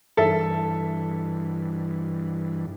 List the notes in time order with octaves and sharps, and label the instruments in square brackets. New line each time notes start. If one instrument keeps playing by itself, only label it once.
[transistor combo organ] G2 E3 [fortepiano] A4 E5